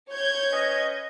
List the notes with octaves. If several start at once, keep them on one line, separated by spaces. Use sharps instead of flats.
C#5 G6 G#6
C#4 B4 D#5